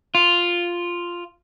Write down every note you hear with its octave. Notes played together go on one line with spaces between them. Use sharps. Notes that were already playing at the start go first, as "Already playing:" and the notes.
F4